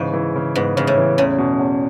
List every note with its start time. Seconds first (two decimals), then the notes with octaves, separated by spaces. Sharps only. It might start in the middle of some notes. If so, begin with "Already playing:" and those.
Already playing: G#2 C#3 E3
0.14 E3
0.36 C#3
0.55 G#2 B3
0.77 G#2 C#3
0.87 A2
0.97 E3
1.18 E2 C#3
1.38 B2
1.59 E2